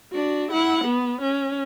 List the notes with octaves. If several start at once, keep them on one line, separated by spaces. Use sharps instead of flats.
D4 F#4
E4 F#5
B3
C#4